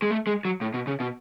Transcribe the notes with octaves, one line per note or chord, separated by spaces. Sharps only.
G#3
A3
G#3
F#3
A2
B2
C#3
B2